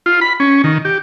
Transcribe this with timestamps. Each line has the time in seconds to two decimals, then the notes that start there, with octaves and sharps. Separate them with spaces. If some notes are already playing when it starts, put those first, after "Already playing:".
0.06 F4
0.21 B5
0.40 C#4
0.64 D#3
0.85 G4